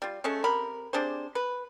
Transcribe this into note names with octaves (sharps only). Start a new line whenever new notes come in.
G3 F4
G#3 A3 C#4 A4
C3 A#4 B5
C3 D4 G#4 C5
B4